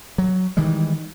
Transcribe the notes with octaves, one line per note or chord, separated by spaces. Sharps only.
F#3
D#3 E3 G3 G#3